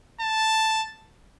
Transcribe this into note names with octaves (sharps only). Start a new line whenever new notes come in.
A5